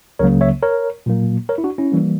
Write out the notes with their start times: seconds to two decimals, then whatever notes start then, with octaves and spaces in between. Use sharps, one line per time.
0.19 C#2 C#3 F#3 A#3 A#4 C#5
0.41 C#5 E5
0.63 A#4 C#5
1.06 A#2 F#3 A#3
1.49 A#4 C#5
1.58 E4
1.64 D4 F#4
1.78 C#4 E4
1.92 E3 G3 A#3